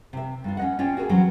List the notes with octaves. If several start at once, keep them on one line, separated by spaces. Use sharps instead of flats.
C3 E5
G2 F4
C#4 D#5 F#5
C#4 F4 C5 D5 G5
F#4 G#4 A#4 G5 G#5
E3 F#3 C4 C#4